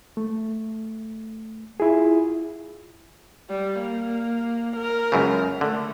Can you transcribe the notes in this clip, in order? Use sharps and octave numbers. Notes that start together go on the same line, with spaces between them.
A3
E4 F4 G#4
G3
A#3
A#4
C#2 F#2 C#3
D3 A3